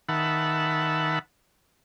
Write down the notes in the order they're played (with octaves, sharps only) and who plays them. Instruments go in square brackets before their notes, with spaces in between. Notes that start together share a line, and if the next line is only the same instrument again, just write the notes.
[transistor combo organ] D#3 E5 F#5 A5 B5